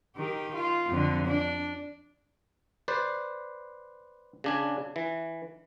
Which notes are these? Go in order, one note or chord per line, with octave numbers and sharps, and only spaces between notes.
D#3 G4
F4
F2 D3
D4
B4 C5 D5
C#3 D4 G#5
E3